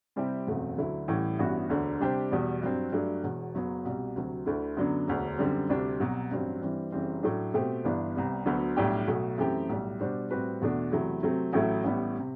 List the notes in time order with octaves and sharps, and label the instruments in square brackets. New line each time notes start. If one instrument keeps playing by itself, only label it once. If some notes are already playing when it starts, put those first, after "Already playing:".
[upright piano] C3 G3 C4 E4 G4
F#1 E2 B2 A3 C4
D2 D3 F#3 A3 E4
A1 A2 E3 G3
A1 G2 E3 B3 F#4
E1 D2 D3
C3 G3 D4 G4 C5
E2 B2 G3
G2 F#3 C4
G2 F#3 A3 D4
E1 E2 B2
F#1 F#2 F#3 B3
C2 B2 G3
D2 C3 F#3
D2 D3 A3 E4
F#2 D3 F#3 B3 D4
E1 D2 D3
F#2 D3 G3 C4
D2 C3 G3 D4
C2 B2 F#3
A1 G2 F#3 C4
G2 E3 G3 C4
F#1 F#2 E3 G3 C4
A2 F#3 A3 D4
B2 A3 C4 G4 C5
G1 G2 E3 B3 D4
C2 C3 G3 B3
D2 D3 F#3 B3
B1 A2 G3 D4 G4
B1 B2 A3
F#2 E3 A3 C4 G4
B1 A2 G3
B2 G3 D4 F#4 C5
A2 G3 C4 F#4 B4
E2 B2 A3 D4
E2 C3 F#3 A3 E4
C3 F#3 A3 C4
A1 A2 F#3 A3 E4
A1 A2 G3 B3
C3